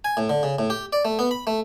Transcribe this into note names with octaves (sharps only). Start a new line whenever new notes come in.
G#5
A2
D3
C#3
A2
G4
D5
A3
B3
B5
A3